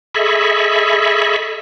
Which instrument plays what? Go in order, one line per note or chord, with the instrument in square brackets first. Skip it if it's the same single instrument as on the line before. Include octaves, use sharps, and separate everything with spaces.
[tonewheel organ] G#4 A4 D#5 E5 B5 C#6